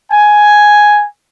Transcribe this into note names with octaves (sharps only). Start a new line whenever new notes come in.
G#5